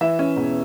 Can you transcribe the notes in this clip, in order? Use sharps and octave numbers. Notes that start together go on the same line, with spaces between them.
E3 E5
C#4
E1